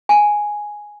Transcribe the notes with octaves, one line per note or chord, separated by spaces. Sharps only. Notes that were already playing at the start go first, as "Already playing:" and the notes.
G#5